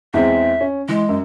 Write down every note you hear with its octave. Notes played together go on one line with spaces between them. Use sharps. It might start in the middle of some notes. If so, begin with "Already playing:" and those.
E2 G#3 C4 E5
C#4
E3 G#3
F#2